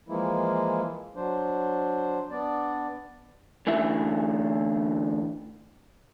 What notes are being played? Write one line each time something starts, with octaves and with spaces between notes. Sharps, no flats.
E3 F3 G#3 A#3 E4
F#3 D4 C5
B3 D4 D5
A2 D3 E3 E5